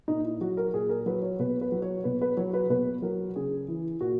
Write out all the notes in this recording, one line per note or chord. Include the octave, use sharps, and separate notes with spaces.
A#2 D#4
E4
F#3 F#4
A#4
A#2 G#4
A#4
F#3 B4
C#5
B2 B4
B4
F#3
C#5
B2 B4
B4
F#3 C#5
B4
B2 B4
F#3 A#4
C#3 G#4
E3
A#2 F#4